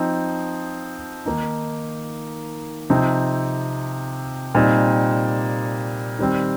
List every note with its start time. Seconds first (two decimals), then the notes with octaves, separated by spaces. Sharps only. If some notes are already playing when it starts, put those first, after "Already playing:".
Already playing: F3 C4 D#4
1.25 D#3 A#3 D#4
2.90 C3 F3 C4 D#4
4.55 A#2 G3 C4 D#4
6.19 D#3 G3 C4